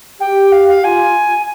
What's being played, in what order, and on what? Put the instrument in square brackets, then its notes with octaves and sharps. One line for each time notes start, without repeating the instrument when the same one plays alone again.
[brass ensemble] G4 [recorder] G5
[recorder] F5
F5
[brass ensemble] F4 [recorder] G#5